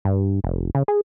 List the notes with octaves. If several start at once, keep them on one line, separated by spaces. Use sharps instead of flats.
G2
F1
C#3
G#4